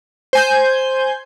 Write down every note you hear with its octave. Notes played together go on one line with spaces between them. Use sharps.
C5 G#5 G6